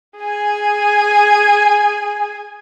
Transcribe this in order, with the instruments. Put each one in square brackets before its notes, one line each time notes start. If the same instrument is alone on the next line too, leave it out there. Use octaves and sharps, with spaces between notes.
[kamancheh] G#4 G#5